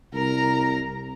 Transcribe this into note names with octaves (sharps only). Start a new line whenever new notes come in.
C2 A#4 A#5